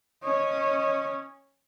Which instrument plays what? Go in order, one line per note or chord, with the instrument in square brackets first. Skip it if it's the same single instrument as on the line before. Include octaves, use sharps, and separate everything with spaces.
[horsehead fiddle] C#4 C#5 [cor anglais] D#5